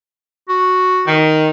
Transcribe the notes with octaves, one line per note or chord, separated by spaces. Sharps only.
F#4
D#3